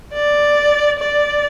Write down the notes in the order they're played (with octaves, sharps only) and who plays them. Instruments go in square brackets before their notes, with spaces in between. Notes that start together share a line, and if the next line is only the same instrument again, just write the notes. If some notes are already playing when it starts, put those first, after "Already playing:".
[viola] D5
D5